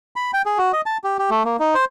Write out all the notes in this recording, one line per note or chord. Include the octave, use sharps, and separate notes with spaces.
B5
G5
G#4
F#4
D#5
A5
G4
G4
A3
A#3
D#4
C5